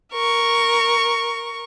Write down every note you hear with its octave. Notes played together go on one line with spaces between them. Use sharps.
A#4 C#6